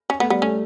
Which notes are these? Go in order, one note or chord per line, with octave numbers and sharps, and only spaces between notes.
C#4
A3 B3
G3 B3
A3 C#4